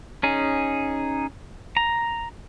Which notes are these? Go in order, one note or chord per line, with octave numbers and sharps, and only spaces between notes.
C#4 D#4 G#4
A#5